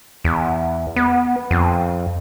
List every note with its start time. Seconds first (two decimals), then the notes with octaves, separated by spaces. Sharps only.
0.24 E2
0.96 B3
1.51 F2